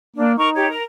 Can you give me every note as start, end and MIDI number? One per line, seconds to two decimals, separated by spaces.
0.16 0.38 58
0.16 0.32 62
0.38 0.73 63
0.38 0.49 70
0.38 0.49 85
0.55 0.67 67
0.55 0.67 73
0.69 0.83 70